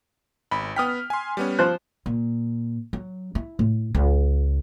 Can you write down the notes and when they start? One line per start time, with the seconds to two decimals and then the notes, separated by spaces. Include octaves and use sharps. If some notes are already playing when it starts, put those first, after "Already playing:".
0.51 G#1 B5
0.76 B3 G5 D#6 F6 B6
1.10 G#5 C6
1.37 G3 B3 C#4
1.59 F3 C5 F#6
2.06 A#2
2.93 F#3
3.35 E4
3.59 A2
3.95 C#2